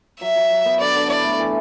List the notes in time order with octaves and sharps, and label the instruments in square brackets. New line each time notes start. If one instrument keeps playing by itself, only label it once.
[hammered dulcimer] F#3 [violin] E5
[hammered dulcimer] F#3
F#3
B3
[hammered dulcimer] D3 [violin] D5
[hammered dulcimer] D3
[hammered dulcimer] E4 [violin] D5
[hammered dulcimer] A3
E3